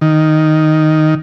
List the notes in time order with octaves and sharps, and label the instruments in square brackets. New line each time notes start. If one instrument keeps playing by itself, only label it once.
[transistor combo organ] D#3